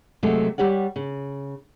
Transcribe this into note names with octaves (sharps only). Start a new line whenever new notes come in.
C3 F#3 G#3 A3
G3 G4 C#5 F#5
C#3